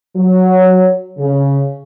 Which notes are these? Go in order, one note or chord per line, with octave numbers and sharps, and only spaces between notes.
F#3
C#3